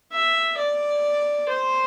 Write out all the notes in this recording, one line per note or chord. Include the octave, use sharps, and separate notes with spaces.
E5
D5
C5